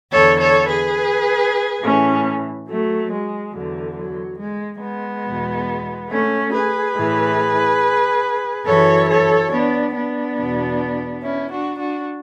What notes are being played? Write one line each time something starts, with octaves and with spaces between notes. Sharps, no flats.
E2 D3 A4 C#5
A4 C#5
G#4 B4
A2 E3 A3 C#4
F#3 A3
G#3
E2 D3 F#3
F#3
G#3
G#3 B3
E2 B2
A3 C#4
G#4 B4
A2 E3
F#2 E3 A4 C#5
A4 C#5
B3 D4
B3 D4
E2 B2
C#4 E4
D4 F#4
D4 F#4